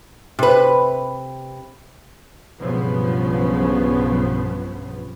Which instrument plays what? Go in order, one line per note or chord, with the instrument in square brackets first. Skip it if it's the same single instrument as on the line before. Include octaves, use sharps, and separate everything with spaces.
[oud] C3 B4
[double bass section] B1 G2 C#3 F3 B3